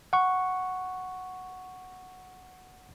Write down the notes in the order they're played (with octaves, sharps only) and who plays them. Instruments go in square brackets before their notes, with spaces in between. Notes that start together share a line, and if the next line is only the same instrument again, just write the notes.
[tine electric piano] F#5 C#6